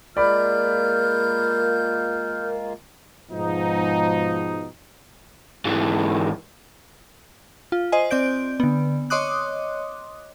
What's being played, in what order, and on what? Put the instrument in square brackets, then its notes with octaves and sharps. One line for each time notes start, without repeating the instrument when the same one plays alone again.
[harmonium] G#3 A#3 F4 [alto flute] A#4 [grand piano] D5 B5 [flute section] F6 G6
[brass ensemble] G#2 B2 F3 D#4
[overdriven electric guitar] G#2 E3
[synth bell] F4
C5 D#5 G#5
C4 D5 G6 D7
D3 B3
C#5 D#5 C6 D6 D#6 F#6